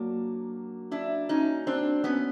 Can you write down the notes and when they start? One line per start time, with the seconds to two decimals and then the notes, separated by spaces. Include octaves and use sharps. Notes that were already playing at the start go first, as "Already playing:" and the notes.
Already playing: F#3 A#3 D4
0.92 D4 E4
1.29 C#4 D#4
1.67 C4 D4
2.04 B3 C#4